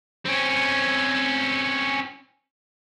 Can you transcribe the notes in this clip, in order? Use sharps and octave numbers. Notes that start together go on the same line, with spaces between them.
C4 C#4